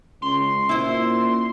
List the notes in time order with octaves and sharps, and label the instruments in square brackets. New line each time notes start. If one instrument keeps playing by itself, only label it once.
[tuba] C#2 [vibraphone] C#4 [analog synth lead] C6
[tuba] A#2 [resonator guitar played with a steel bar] E4 C5